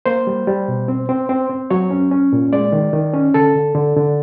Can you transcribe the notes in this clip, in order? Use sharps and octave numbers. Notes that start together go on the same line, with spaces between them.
A#3 C5
G3
G3
B2
C4
C4
C4
C4
F#3 C#5
C#4
C#4
A#2
G#3 D5
D#3
D#3
C#4
D3 A4
D3
D3
D3